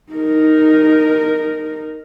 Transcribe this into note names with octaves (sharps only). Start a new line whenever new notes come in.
D#4 A#4